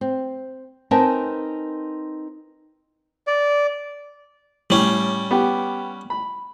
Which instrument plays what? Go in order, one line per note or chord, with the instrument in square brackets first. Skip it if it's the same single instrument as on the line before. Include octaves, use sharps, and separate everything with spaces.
[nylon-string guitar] C4
C4 D#4 A#4 B4 G#5 A5
[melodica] D5
[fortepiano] A2 [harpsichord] G3 C#4
[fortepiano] B3 G4
B5